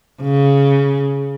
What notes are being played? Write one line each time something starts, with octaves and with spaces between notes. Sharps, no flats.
C#3